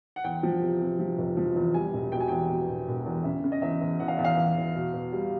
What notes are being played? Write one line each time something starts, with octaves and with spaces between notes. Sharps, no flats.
F#5
E2 G5
F3
C3
C3
F3
F1
F3
E2
G3 G#5
E1
B2 G5
G#5
E2 G5
B2
E1
E1
E2
C#3 E5
C#3
D#5
E2 E5
E2
E2 F#5
F5
E2 E5
F5
E3
E2
B2
B2
G3